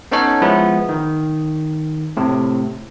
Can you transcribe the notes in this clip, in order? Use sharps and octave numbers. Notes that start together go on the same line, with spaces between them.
B3 C#4 D#4 A4 C#5
F3 G#3 B3 E4
D#3
A2 C3